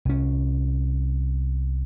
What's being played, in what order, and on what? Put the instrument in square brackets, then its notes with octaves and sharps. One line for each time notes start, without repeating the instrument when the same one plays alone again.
[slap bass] C2 C#4